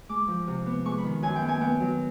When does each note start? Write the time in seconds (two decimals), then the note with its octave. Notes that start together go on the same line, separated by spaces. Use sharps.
0.09 G#3 D6
0.28 F3
0.47 C3
0.66 B3
0.85 G#3 C#6
0.98 B5
1.04 D#3
1.22 F#2 G#5
1.36 G5
1.42 B3
1.49 G#5
1.61 B3 G5
1.80 F#3